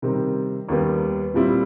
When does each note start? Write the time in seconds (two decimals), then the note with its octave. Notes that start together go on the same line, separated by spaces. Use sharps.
0.02 C3 D#3 G3 C4
0.68 D#2 D#3 G3 B3
1.34 A#2 G3 C4 E4